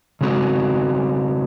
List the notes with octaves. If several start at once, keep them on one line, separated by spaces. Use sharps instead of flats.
C#3 G#3 C4 F#4